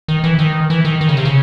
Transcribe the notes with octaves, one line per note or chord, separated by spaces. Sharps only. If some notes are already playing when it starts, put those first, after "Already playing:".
D#3
E3
D#3
E3
D#3
D#3
C#3
C3
C#3